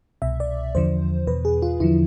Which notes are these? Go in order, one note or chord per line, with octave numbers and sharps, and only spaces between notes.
C2 B2 E5
D5
E2 D3 F3 C5
E2 B2 B4
G#4
F4
E2 D3 F3 E4